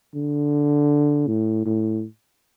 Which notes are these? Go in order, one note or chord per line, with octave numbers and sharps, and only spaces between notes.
D3
A2
A2